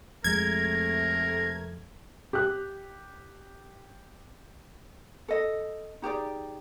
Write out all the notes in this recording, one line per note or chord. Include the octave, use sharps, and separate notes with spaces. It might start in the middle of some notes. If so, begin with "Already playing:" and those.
F2 C3 G#3 A3 A#4 G#6
G4 F#6
A4 D#5
D#4 G4 G#4 D5